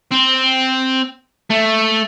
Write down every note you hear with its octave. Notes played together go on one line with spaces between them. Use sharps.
C4
A3